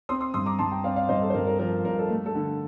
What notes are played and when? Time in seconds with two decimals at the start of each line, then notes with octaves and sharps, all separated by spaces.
0.09 C4 C6 D#6
0.21 C6 D#6
0.34 G2 C6 D#6
0.46 A#5 D6
0.59 G2 A5 C6
0.71 G5 A#5
0.84 C4 D5 F5
0.96 D5 F5
1.09 G2 C5 D#5
1.22 A4
1.30 C5
1.34 G2 A#4
1.47 A#4
1.59 F3 A#4
1.84 G2 A#4
1.99 A4
2.09 A3
2.26 A4
2.35 D3